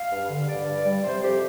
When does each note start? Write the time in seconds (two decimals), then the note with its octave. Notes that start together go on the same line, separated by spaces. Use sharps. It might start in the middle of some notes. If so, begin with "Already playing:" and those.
Already playing: F5
0.10 G2
0.29 D3
0.47 G2 D5
0.66 G2
0.85 G3
1.03 C3 C5
1.22 F2 G4